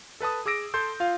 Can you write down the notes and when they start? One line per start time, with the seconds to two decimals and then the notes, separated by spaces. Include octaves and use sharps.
0.20 A4 B4 A5 D#6
0.46 G#4 D6 E6 A#6 D7
0.74 A4 C6 G6
1.00 F4 F5